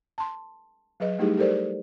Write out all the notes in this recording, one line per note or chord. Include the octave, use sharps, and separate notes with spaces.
A5 C6
F#3 G#4 B4 D#5
G3 A3 D#4 E4 G4 G#4
G4 A4 A#4 C5 D5